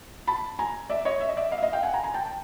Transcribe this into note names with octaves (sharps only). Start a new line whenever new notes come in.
A5 B5
G#5 A#5
D5 E5
C#5 D#5
E5
D#5
D5 E5
D#5 F5
E5
D#5 F5
F5 G5
F#5 G#5
G#5 A#5
G#5 A#5
G5 A5
A5